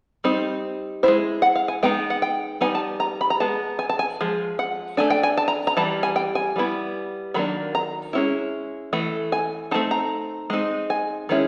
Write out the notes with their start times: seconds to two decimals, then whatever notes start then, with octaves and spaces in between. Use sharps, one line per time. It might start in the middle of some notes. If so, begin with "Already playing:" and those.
0.24 G3 C4 D#4
1.03 G#3 C#4 E4 C5
1.42 F#5
1.56 F5
1.68 G#5
1.83 G#3 B3 D#4 G5
2.10 F#5
2.22 G5
2.61 G3 B3 D#4 G#5
2.75 A5
3.00 A#5
3.21 B5
3.30 A#5
3.40 G#3 B3 A5
3.79 G#5
3.89 A5
3.99 G#5
4.21 F3 G#3
4.59 F#5
4.97 A3 D4 G#5
5.10 G5
5.23 G#5
5.37 A5
5.48 A#5
5.67 A#5
5.77 E3 G3 A5
6.03 G#5
6.16 G5
6.35 G#5
6.56 G3 B3 E4
7.34 D#3 F#3 A#3 D4 B5
7.75 A#5
8.13 G#3 C#4 E4
8.93 E3 A3
9.32 G#5
9.71 A3 C4 D#4 A5
9.91 A#5
10.50 G#3 C4 D#4
10.90 G#5
11.29 D#3 G#3 C#4 E4